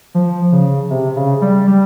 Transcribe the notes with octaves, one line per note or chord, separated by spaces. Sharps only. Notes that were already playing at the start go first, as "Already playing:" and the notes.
F3
C#3
C3
C#3
G3
G3